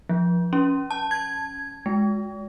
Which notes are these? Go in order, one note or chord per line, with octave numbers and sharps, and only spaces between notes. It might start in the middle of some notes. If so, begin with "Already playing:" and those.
F3
C#4
A5
G#6
G#3